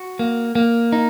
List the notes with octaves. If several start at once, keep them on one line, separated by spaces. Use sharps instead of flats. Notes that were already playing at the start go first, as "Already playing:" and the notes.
Already playing: F#4
A#3
A#3
D#4